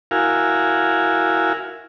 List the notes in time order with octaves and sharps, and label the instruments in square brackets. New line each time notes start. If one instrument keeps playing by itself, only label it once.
[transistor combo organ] E4 F#4 A#4 F5 G#5